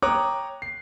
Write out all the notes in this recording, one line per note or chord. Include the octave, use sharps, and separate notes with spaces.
C#5 G5 A#5 D6 D#6 F#6
C7